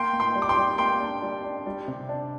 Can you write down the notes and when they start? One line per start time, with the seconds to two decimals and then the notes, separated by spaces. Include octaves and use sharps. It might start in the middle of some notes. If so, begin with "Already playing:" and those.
Already playing: A#3 G5 C6
0.13 A#3
0.20 G5 C6
0.35 G3
0.42 D6
0.49 G5 C6
0.56 G3
0.78 A#3 G5 C6
1.00 D4
1.22 G3
1.44 D4
1.66 G3
1.88 C3
2.09 D4